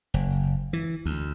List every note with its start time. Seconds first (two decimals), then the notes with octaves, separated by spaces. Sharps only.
0.14 F#1
0.73 E3
1.06 D2